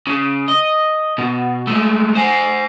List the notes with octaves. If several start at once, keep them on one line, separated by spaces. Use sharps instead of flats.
C#3
D#5
B2
G#3 A3
C5 G#5